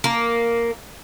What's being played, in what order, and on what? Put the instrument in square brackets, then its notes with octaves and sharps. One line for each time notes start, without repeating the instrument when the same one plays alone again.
[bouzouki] A#3